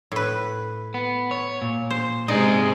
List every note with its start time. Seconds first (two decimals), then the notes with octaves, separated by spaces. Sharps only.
0.12 A2 B4
0.94 B3
1.31 C#5
1.62 A#2
1.90 C5
2.28 G#2 C3 G#3 D#4 G#4 D5 D#5